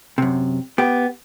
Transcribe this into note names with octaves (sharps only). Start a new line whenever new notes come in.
F#2 C3
B3 G4